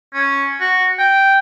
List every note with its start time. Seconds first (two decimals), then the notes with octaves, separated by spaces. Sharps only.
0.14 C#4
0.61 F#4
0.99 G5